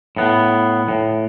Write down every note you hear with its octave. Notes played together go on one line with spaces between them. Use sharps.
A2 B3
A2